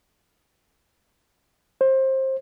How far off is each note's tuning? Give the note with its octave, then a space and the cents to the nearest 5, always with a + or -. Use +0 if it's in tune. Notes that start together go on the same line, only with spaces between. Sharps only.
C5 +20